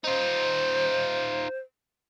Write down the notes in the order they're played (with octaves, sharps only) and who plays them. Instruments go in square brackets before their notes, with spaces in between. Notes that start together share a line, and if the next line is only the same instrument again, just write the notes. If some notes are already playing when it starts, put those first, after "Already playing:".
[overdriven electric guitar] D#4 F4 [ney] C5